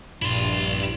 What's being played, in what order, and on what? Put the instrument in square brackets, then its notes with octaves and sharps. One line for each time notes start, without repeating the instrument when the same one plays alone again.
[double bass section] A#1 [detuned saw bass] G2 [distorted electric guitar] E4 C6